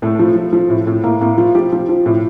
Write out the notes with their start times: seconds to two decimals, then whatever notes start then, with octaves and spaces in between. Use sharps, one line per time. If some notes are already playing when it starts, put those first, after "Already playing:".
0.02 A2 A3
0.19 F3
0.35 F3
0.53 F3
0.70 A2
0.87 A2
1.04 A2 A#3
1.21 A2 A#3
1.38 F3 F4
1.55 F3 G4
1.73 F3
1.89 F3
2.06 A2